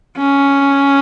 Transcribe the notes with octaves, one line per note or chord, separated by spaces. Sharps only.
C#4